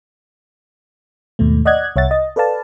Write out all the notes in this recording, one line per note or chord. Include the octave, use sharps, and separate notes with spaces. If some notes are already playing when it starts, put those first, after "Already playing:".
D#2 G#2 B2 A3
D5 D#5 F#5 F#6 G#6
C2 C#5 E5 F#5 A6
D#5
A4 B4 D5 F5 A5